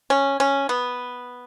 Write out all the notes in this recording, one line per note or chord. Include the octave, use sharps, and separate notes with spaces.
C#4
C#4
B3